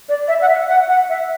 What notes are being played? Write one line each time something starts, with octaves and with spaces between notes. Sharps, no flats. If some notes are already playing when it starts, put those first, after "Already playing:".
D5
E5
F#5
E5
F#5
F#5
E5